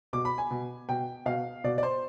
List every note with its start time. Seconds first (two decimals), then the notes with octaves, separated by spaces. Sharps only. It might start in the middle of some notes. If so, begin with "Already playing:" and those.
0.13 B2 D6
0.25 B5
0.38 G#5
0.51 B2
0.89 B2 G5
1.26 B2 F5
1.64 B2 D5
1.78 D5
1.83 C5